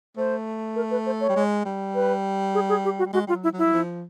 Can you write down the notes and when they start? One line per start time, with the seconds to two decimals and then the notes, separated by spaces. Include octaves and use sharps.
0.17 A3 C5
0.76 A#4
0.91 B4
1.06 C5
1.21 C#5
1.29 G3
1.36 G#3
1.65 G3
1.95 B4
2.54 G#4
2.69 G#4
2.84 G4
2.99 F#4
3.05 G3
3.13 G#3 F#4
3.27 G3 F4
3.33 F#3
3.44 E4
3.53 F#3
3.58 E4
3.66 F#3
3.73 F3